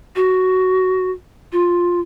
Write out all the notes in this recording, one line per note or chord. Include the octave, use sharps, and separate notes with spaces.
F#4
F4